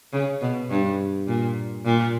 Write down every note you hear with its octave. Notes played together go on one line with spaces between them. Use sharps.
C#3
B2
G2
A#2
A#2